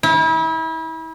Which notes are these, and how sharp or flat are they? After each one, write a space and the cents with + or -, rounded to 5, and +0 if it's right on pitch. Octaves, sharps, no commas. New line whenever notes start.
E4 -35